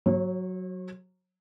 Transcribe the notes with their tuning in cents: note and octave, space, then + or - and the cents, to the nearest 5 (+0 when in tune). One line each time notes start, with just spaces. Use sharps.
F#3 +0 C#5 -40